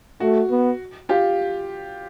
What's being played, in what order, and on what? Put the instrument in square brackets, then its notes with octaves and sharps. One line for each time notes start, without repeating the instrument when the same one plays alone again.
[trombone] A3 [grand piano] F#4
[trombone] B3
[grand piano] F4 G4